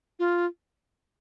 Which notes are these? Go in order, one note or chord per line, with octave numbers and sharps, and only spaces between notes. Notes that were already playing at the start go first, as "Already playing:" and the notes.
F4